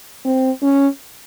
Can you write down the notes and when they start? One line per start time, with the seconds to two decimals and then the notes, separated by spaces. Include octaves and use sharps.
0.25 C4
0.62 C#4